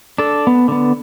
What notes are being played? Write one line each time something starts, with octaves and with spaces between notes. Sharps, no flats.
D4 A4
B3
D3 B3